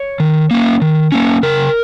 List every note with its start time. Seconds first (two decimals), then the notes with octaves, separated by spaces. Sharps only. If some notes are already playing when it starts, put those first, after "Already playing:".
Already playing: C#5
0.20 D#3
0.51 A#3 C#4
0.82 D#3
1.12 A#3 C#4
1.43 C#3 A#4